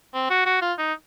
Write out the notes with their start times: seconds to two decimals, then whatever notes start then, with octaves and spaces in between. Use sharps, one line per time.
0.14 C4
0.30 F#4
0.46 F#4
0.62 F4
0.78 D#4